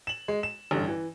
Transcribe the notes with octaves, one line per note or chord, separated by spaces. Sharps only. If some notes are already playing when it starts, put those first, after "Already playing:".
E7 F#7
G#3
E7
A1 G2 D3
E3